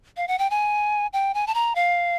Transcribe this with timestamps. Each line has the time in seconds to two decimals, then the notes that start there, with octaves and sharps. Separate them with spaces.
0.17 F5
0.28 F#5
0.39 G5
0.50 G#5
1.13 G5
1.34 G#5
1.47 A5
1.55 A#5
1.75 F5